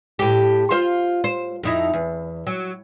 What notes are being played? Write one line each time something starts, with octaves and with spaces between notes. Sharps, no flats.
A2 G4
F4 C5 F5
C5
F2 D#4 E4
E2
F#3